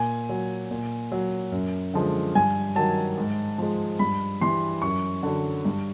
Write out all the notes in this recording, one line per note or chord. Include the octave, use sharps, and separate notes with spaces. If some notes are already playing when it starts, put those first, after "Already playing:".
Already playing: A#2 G#5
F#3
A#2
F#3
F#2
D3 F3 G#3
G2 G#5
D#3 F#3 A5
G#2
F3 G#3
G2 B5
E3 G3 C6
F#2 C#6
D3 F#3
G2